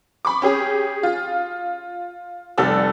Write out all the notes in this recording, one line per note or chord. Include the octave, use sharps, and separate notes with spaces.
B5 C#6 D6
C#4 G4 G#4
F4
F1 G3 A4 D5 E6